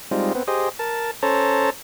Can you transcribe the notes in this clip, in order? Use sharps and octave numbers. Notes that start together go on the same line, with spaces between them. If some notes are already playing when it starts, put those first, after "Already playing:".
G3 G#3 C4 D#4 F4
B3 C4
G4 G#4 C5 D#5
A#4 A5
C#4 A4 C5 C#5 A5 A#5